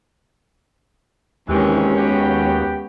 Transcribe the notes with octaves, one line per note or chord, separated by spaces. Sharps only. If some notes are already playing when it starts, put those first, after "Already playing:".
D#2 C3 D#3 E3 G#3 C#4 G4
B3 F#4 G4 G5